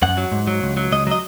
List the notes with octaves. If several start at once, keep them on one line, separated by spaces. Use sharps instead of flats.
F#2 F#5
F#3
G#2
F#3
C#2
F#3
C#2 D#5
F#3 D#5